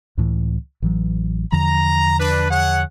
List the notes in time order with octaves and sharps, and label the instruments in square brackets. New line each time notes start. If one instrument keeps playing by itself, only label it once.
[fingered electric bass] C#2 A2 E3
A1 E3 F#3
[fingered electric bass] E2 D3 F3 [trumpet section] A#5
[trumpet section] D4 B4
G#4 C#5 F#5